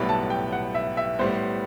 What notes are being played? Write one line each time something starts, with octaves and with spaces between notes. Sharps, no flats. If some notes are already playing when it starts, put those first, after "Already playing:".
Already playing: B1 A2 G3 B3 E4 B5
A5
G5
F#5
E5
E5
A2 G3 B3 C5